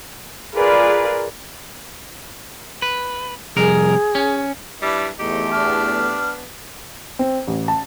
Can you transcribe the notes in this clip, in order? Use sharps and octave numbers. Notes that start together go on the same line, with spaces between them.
F4 G#4 A#4 B4 D5
B4
C2 F2 G#4 A#4
C#4
G3 D4 E4 B4
E2 A3 D#4 G4
B3 D4 F6
C4
A1
A5